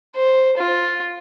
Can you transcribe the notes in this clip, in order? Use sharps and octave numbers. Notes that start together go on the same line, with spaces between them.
C5
F4